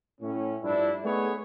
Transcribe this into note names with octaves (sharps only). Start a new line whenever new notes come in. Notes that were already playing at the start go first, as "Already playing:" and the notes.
A2 C#4
G2 F3 D4 E4
A3 B3 D#4 G#4 B4 C#5